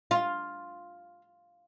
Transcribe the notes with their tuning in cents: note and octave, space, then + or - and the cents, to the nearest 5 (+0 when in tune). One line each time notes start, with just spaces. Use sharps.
F4 +5